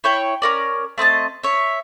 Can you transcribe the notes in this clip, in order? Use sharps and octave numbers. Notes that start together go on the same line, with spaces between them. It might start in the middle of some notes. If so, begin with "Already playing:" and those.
E4 C#5 G5
C#4 A#4 D5
A3 C4 D#5 A5
C#5 E5